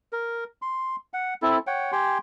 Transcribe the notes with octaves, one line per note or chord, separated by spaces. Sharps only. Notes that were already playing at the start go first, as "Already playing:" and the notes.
A#4
C6
F#5
C4 E4 A4
C#5 F#5 G5
G4 G5 G#5 C6